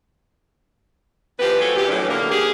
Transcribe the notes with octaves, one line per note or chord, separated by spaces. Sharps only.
E3 F3 G4 B4
G#3 F#4 A4 C#5
E2 A#2 G4
F#2 A2 E3 F#3 D4
B2 D3 A#3
D#2 G4 G#4